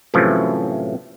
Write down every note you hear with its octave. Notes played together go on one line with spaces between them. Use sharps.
F#2 A2 C3 E3 F3